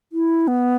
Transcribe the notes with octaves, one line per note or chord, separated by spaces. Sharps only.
E4
B3